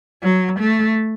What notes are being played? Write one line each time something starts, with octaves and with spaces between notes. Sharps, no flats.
F#3
A3